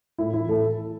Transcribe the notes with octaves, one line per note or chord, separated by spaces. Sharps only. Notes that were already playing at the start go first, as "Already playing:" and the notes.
A2 E4
E3 E4
A2 A4